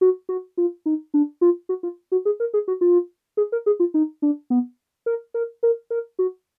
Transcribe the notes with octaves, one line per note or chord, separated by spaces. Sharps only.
F#4
F#4
F4
D#4
D4
F4
F#4
F4
F#4
G#4
A#4
G#4
F#4
F4
G#4
A#4
G#4
F4
D#4
D4
B3
A#4
A#4
A#4
A#4
F#4